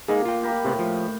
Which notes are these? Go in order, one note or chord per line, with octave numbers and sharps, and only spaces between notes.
G#3 A#3 D#4 G#4
F4 G5
G4 A#4 B5
A2 C3 B3
F3